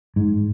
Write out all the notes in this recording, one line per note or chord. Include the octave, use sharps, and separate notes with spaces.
G#2